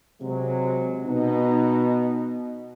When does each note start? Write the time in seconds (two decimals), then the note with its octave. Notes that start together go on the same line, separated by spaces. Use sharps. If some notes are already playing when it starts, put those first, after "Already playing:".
0.21 C3 F#3 G#3
1.07 B2 D#4